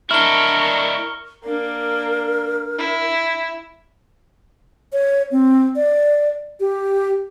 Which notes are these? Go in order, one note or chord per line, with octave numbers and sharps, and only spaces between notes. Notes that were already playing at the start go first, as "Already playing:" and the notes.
D4 E4 A#4 C#6 F6 G7
A#3 D4 A#4
E4
C#5
C4
D5
G4